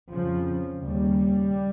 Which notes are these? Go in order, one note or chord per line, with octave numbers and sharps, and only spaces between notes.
F2 C#3 F3
D#2 C#3 G3